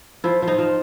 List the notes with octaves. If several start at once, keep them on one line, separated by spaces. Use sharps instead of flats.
F3 E4
F3
D#4
F3